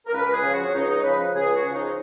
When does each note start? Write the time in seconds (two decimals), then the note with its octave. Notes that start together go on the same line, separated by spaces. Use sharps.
0.07 A#4
0.13 C#2 B4
0.33 G#4
0.43 C#3 F3
0.54 F#4
0.65 C#4
0.74 C#2 D#4
0.89 D#4
0.98 C#5
1.04 C#3 F3 B4
1.34 C#2 G#4
1.55 F#4
1.65 C#3 F3
1.75 D#4